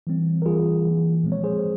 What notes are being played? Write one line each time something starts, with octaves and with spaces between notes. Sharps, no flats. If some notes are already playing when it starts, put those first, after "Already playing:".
E3 G3 C4
A#4
E3 G3 A#3 F4 G#4
E3 A#3
A#2 F3 G#3 C4
C#5
G#4 C5